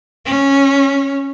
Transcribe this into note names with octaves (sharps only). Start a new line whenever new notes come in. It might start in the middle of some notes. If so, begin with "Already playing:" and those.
C#4